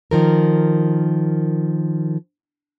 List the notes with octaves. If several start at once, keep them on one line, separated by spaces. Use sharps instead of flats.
D#3 F3 A#4